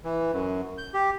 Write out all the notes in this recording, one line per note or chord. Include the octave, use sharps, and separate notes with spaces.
E3
F#2
G6
G4